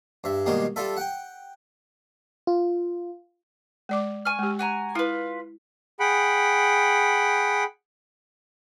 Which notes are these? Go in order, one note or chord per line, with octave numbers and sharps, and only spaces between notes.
G2 E5
B2 D#3 G3 G#3 A#3 G4
G3 F4 A4 E5
F#5 G5
F4
G#3 D5 D6
G#5 C#6 F6
G#3 G4
F#4 G#5 A#5
E4 F4 B4
G#4 F#5 G5 B5